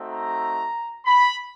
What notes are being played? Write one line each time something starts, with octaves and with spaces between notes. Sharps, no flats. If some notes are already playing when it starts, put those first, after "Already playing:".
Already playing: A3 C4 D#4 F#4
A#5
B5